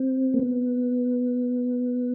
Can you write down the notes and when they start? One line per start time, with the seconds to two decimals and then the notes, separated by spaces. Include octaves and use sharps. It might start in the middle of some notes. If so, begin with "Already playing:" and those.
Already playing: C4
0.34 A#3
0.40 B3